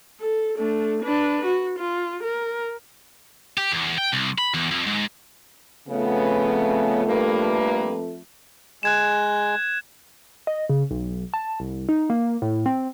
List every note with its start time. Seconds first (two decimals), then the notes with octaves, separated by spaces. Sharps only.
0.21 A4
0.57 A3 D4
1.02 D4 B4
1.45 F#4
1.79 F4
2.23 A#4
3.57 G4
3.72 E2
3.98 G5
4.13 C2
4.38 B5
4.54 E2
4.71 F2
4.87 G#2
5.89 F2 C#3 A3 B3
7.06 G2 A#3 B4
8.83 G#3 F#6 G#6 E7
10.47 D#5
10.69 C#3
10.91 B1
11.34 A5
11.60 C2
11.89 D#4
12.10 A#3
12.42 A2
12.66 C4